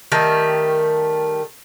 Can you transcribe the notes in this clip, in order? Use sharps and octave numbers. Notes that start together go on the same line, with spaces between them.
D#3 G3 A3 A#4